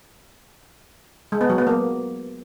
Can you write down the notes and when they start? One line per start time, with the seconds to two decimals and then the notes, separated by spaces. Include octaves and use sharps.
1.32 G#3
1.41 B3
1.49 F#3
1.58 B3
1.67 A#3